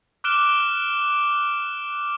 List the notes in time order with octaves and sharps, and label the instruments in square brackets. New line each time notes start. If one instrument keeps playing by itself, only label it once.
[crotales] D6 F6 F#6 D7 E7 G7